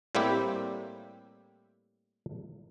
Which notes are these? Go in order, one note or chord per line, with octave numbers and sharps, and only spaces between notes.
A2 G3 A#3 C4 E4 G4